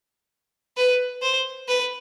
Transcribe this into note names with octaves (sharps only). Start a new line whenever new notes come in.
B4
C5
B4